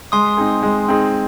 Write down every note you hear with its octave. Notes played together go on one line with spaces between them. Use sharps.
G#3 C6 D#6
C4 D#4 G#4
G#3
C4 D#4 G#4